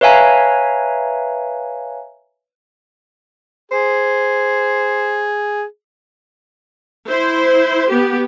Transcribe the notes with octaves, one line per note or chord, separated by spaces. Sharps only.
B4 C#5 E5 F5 G#5 A#5
G#4 C5
E4 C5
B3 G4